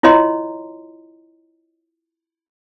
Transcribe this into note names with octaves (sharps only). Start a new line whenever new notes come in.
E4 F4 C#5 D#5 A#5 C6